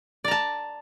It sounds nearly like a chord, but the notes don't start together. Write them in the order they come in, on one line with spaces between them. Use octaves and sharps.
D5 A#5 A5